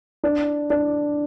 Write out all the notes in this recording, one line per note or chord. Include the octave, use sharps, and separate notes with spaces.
D4
D4